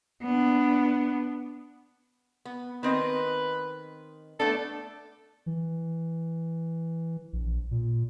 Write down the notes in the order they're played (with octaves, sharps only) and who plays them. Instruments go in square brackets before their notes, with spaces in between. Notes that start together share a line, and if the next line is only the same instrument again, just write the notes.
[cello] B3 D4
[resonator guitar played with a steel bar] B3
[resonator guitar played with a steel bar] D#3 C4 D#5 [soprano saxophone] B4
[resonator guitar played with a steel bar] A3 B3 D4 [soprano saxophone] A4
[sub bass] E3
A#1
A#2